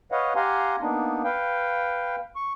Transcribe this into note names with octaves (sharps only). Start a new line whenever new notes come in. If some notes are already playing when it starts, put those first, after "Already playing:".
B4 C#5 D#5 F5 F#5
G4 F5 F#5 G#5 A#5 C6
A#3 B3 D4 D#4
B4 F5 G5
C#6